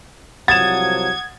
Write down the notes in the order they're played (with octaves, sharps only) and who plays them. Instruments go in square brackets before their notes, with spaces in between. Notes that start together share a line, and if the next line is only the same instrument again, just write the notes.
[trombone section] C2 F3 F#3 [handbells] F#5 D#6 [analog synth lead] G#6 [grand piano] A6 E7